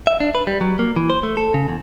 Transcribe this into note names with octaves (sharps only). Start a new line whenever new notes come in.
E5
D4
B4
G3
F#3
A#3
E3
C5
A3
A4
C#3
E2